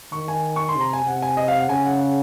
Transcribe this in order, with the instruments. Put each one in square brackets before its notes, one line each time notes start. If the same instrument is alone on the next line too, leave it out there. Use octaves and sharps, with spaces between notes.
[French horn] D#3 [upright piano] C#6
[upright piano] G#5
C#6
C6
[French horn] C3
[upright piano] A#5
G#5
[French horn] C3 [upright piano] F#5
[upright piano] G#5
D#5
F5
F#5
[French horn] C#3 [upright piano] G#5
[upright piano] F#5
F#5